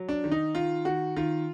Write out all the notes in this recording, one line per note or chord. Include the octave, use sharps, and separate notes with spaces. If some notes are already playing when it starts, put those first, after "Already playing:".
Already playing: F#3
D4
D#3
D#4
D#3 F4
D#3 F#4
D#3 F4